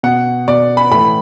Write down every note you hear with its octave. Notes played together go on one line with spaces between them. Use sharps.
B2 F#5
B2 D5
B5
A2 E3 B5